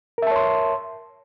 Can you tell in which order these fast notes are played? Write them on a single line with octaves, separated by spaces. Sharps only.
A#4 E5 A5 C#5 C6